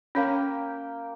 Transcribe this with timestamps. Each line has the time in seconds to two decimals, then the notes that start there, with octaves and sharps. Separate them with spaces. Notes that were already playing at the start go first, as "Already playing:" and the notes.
0.15 A#3 C#4 C#5 G5